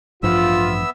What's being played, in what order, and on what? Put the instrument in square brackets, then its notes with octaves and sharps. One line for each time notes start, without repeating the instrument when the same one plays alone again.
[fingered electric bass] A1 G2 F3 [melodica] B3 E5 [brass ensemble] F4 [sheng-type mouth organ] E6